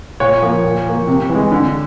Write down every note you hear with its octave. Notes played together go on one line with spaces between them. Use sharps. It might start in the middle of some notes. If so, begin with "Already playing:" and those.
A#2 C#5
F3 A#3
A#2
F3 A#3
C3
E3
G#3
D3